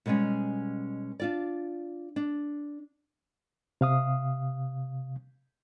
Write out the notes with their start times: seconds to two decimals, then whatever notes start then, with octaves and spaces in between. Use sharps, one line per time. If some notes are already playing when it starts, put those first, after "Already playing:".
0.06 B2 G3 G#3 B3 C#4
1.20 D4 F4 D5
2.16 D4
3.81 C3 F5 D#6